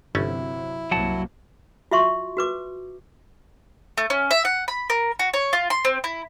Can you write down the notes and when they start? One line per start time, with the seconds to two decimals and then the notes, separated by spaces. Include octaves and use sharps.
0.15 G1 C3 F#3 A3 C#4 E4
0.91 C2 F#2 F#3 A#3 F#5 A5
1.91 F4 F#4 E5 C6 C#6
2.37 F#4 B4 D6
3.98 A3
4.10 C#4
4.31 E5
4.45 F#5
4.68 B5
4.90 A#4
5.19 F#4
5.34 C#5
5.53 F4
5.70 C6
5.85 C4
6.04 E4